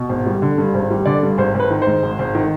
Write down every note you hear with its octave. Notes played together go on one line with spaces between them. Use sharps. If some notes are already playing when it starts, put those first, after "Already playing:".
Already playing: B2
G#1
G3
D3
G2
G#1
G3
D3 D5
G2
G#1 C5
G#1 B4
D#3
C5
G#2
G#1
G#1
D#3